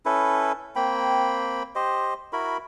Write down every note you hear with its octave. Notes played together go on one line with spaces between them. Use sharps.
C#4 E4 A4 B4
A#3 C4 G5 B5
G4 C5 D#5
E4 F#4 A#4 B5